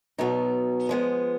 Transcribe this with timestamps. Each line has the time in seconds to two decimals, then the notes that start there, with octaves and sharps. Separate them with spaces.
0.18 B2 F#3 B3 D#4
0.89 F3 G#3 B3